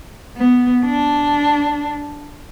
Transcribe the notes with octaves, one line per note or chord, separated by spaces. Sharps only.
B3
D4